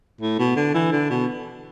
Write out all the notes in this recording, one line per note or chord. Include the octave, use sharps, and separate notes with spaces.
A2
B2
D3
E3
D3
B2